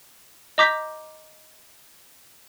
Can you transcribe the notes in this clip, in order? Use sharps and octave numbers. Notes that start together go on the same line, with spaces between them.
D#5 A#5 D6 G6 B6